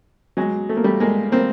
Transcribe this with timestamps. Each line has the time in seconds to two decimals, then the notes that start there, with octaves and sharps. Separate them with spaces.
0.37 F#3 G#3
0.69 A3
0.77 A#3
0.84 G3 A3
1.00 G#3 A#3
1.32 A#3 C4